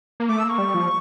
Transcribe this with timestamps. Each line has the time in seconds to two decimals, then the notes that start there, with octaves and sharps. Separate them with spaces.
0.20 A#3
0.28 A3 D6
0.38 E6
0.44 A#3 C#6
0.58 G3
0.74 F3